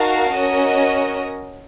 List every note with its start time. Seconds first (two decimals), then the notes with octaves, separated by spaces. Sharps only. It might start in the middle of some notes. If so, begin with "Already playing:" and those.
Already playing: D#4 F#4 A#4 F5 A5
0.33 C#4 F#4 A#4 D#5